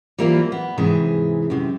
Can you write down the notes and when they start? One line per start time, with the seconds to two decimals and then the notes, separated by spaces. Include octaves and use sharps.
0.18 E3 G3 A#3 C4 E4 F4
0.52 B3
0.78 G#2 C3 E3 G#4 E5
1.50 F#2 C3